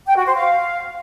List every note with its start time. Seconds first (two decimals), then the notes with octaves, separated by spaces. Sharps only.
0.07 G5
0.16 F#4
0.25 C5
0.35 F5